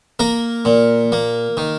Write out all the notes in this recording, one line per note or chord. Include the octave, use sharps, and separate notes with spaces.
A#3 A#4
A#2
A#3
D#3